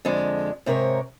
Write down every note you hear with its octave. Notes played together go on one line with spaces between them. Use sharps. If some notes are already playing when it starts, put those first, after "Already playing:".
F2 D3 G#3
G#2 C3 A#4 C#5